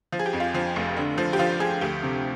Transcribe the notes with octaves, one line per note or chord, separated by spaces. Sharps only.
F3
G#4
G4
F2
F4
F3
F1
D3
F3
G4
F3 F4
F3 G#4
D2 G4
C3